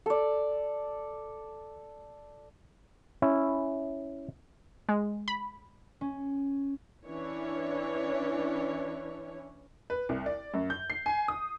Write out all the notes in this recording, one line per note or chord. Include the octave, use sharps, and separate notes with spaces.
A4 D5
C#4 E4
G#3
B5
C#4
E3 C#4 D4 C#5
B4
C2
D5
F#2
G6
C7
G#5
D#6